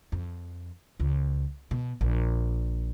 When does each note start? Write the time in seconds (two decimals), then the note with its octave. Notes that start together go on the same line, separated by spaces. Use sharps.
0.12 F2
1.00 C#2
1.71 B2
2.01 A#1